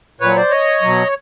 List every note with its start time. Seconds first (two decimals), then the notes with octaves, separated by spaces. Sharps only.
0.20 A#2 F#3 B4 C#5
0.36 C5 D5
0.51 C#5 D#5
0.82 B2 F#3